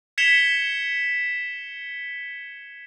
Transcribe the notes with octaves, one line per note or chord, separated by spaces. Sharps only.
G#6 B6 C#7 E7 F7 G7